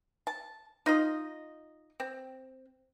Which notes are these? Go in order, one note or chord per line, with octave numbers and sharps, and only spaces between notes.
A5
D#4 F4 D#5
C4